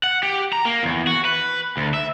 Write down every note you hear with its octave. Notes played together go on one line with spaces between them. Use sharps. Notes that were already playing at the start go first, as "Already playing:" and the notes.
F#5
G4
A#5
A#3
E2
F#4
B4
D2
E5